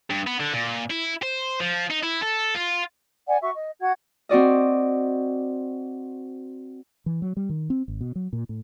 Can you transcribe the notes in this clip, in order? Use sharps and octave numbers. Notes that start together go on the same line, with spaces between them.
G2
B3
D3
A#2
E4
C5
F3
D#4
E4
A4
F4
D5 F#5 G#5
F#4 E5 C#6
D#5
F#4 F#5 G#6
C4 F#4 D5 D#5
E3
F#3
G3
D#3
C4
G#1
B2
F#3
A#2
A2